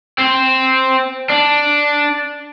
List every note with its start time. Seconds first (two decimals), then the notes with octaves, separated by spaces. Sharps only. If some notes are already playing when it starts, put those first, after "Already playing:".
0.18 C4
1.30 D4